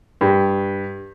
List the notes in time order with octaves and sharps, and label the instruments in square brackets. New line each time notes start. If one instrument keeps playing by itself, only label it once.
[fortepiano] G2